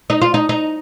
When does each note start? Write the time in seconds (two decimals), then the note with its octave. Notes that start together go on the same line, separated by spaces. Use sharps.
0.10 D#4
0.22 F4
0.34 D#4
0.49 D#4